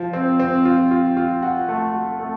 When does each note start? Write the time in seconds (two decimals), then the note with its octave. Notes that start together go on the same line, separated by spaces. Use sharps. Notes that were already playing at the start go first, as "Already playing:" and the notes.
Already playing: F3
0.13 C4
0.39 C4
0.65 F4
0.91 F4
1.17 F4
1.42 F#4
1.68 A3
1.94 F#4
2.19 A3